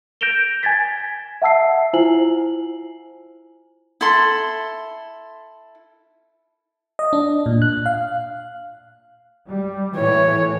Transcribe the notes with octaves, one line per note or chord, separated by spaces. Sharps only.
G6 A#6 D7 E7 F7 G7
G#5 G#6 A6 B6
E5 F#5 A5 E6 C7
E4 F4 C5 G#5 F#7
E4 A4 C6
D#5
D4
A#2
F#6
F5
G3
A2 E3 C#5